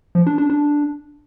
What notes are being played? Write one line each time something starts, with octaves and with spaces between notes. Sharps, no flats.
F3
D4
D4
D4